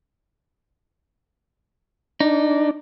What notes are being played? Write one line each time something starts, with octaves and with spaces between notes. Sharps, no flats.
D4 D#4